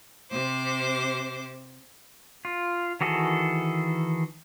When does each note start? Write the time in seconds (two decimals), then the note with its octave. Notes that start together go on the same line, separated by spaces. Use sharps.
0.30 C3 C5 D6
2.45 F4
3.01 D#3 E3 F#4 G#4 A4